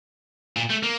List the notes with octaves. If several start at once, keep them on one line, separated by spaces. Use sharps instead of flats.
A#2
A3
A#3